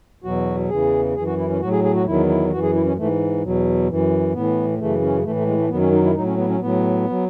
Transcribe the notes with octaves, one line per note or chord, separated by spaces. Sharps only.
E2 B2 F#3 F#4
E2 C#3 E3 G#4
F#2 E3 G#4
F#4
E4
C#4
A2 F#3 F#4
G#4
G#4
F#4
E2 D#3 F#3 E4
E4
F#2 E3 F#4
G#4
E4
C#4
G#2 E3 A3
E2 B2 F#3
F#2 E3
A2 E3 B3
F#2 C#3 E3 A3
C#4
A2 E3 A3
A3
G#3
A3
F#2 D#3 F#3 B3
C#4
D#4
E4
A2 F#3 D#4
C#4
B3
C#4
A2 F#3 B3
F#3